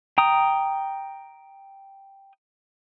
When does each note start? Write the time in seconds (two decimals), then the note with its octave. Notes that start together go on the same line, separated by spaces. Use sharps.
0.18 G5 A#5 D#6